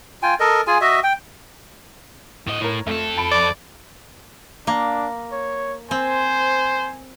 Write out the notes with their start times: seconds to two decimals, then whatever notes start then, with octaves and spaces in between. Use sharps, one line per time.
0.23 F4 G5 G#5
0.40 A4 A#4 D#5
0.67 F4 G#4 G#5
0.81 F#4 D#5 E5
1.03 G5
2.47 A2 D#5
2.61 A2 A#4 C#5
2.87 F2 A3 A4
3.17 A5 B5 D7
3.32 D5
4.67 A#3 D4
5.32 C#5
5.91 C4 C5 G#5